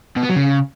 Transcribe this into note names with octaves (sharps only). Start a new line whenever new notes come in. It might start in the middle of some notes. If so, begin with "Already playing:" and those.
B2
B3
F#3
C#3